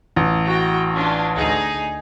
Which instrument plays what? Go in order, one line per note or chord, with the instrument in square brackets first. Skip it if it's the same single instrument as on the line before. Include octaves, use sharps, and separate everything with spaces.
[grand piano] A1
[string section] F#4 G5 A#5
C#4 D4 F4
D2 D#4 G#4